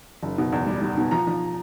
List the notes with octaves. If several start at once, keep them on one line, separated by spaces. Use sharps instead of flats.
F#1
B2
E2
G3
G3
B2
F3 A#5
F3